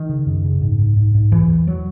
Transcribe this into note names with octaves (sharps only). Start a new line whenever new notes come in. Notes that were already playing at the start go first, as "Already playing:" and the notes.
Already playing: D#3
C#3
F#2
C#3
G#2
G#2
G#2
G#2
E2 E3
E2
F#3